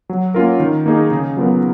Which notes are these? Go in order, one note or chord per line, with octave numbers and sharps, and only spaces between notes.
F#3
A#3 C#4 F4 A#4
D#3
A#3 D#4 G#4
C#3
F#3 B3 F4 A#4